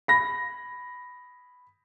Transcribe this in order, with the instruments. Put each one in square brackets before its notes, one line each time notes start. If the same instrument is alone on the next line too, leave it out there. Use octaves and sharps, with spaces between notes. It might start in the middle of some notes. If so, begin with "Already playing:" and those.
[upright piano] B5 A#6